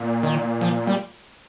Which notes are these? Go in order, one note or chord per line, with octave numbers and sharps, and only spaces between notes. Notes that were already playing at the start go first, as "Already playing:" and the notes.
Already playing: A#2
D#3
F3
G3